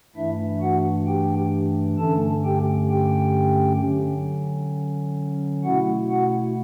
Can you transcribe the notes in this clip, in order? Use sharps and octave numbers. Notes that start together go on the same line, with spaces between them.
G2 E3 A3 D4 E4 E5
F#4 F#5
G4 G5
G2 D3 A3 C#4 A4 A5
G4 G5
G4 G5
D3 F#3 C#4
B2 A3 E4 F#4 F#5
F#4 F#5